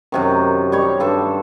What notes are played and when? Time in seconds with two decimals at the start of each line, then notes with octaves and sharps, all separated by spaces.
0.12 F#2 C3 D#3
0.72 G3 C#5 D#5
1.00 G2 A4 C5